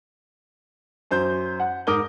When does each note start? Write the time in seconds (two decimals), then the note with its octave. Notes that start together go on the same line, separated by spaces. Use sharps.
1.11 F#2 C5 G6
1.60 F#5
1.87 G#2 A#4 D6 D#6 G7